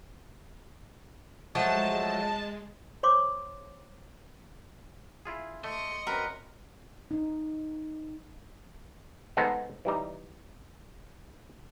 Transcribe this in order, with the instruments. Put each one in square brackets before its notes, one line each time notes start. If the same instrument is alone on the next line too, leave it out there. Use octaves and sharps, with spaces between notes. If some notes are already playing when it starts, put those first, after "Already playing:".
[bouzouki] F3 F#3 A3 [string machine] G#3 [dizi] D#5 [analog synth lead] A5
[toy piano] C5 C#5 C6 D6
[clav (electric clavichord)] E4 F4 G#4
[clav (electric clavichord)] A3 [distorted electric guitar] D#5 [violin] C6 C#6
[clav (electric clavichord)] F#2 C4 [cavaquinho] A#4 B4
[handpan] D#4
[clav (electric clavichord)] G#3 B3 D#4 A4 C5 F#5
E3 G3 D#4